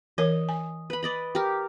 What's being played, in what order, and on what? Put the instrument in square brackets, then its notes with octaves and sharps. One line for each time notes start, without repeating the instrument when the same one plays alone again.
[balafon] E3 A#4 C#5 [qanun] D#5
[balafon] G#5
[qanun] B4 B5
D5 D#5 B5
G4 A#4